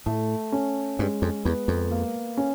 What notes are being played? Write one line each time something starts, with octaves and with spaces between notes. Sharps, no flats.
A2 A3
C#4
G2 G#3
F2
E2 B3
F2
A#3
C#4